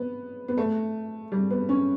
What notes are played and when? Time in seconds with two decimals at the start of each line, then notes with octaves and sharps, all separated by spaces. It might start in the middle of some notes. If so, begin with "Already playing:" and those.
Already playing: B3
0.48 B3
0.57 A3
1.32 G3
1.50 B3
1.69 C#4